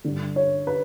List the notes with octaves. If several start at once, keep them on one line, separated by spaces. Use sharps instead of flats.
G2 D3
C#5
B4